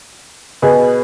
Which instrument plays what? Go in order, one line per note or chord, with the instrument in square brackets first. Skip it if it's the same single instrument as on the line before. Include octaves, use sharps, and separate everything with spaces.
[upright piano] B2 B3 G#4